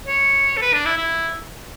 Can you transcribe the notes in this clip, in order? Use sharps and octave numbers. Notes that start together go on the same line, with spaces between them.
C#5
A4
B4
D4
E4
E4